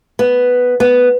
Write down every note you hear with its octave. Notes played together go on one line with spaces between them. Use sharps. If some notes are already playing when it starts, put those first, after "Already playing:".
B3
B3